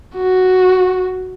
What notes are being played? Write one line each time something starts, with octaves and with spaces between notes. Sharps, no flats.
F#4